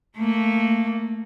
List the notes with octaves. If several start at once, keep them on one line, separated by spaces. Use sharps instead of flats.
A3 A#3